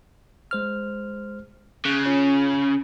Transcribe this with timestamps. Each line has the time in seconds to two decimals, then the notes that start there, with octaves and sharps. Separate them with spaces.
0.51 G#3 C5 F6
1.85 C#3 F#6
2.06 C#4 F4 C#5